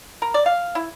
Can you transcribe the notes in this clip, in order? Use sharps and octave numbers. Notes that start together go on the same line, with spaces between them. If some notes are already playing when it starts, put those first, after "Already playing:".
A#4
D5
F5
E4